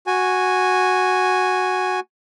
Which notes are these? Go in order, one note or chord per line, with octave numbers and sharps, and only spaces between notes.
F#4 G#5